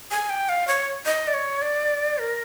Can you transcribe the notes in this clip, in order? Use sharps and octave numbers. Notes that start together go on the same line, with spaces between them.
G#5
G5
F5
C#5
D#5
D5
C#5
D5
A#4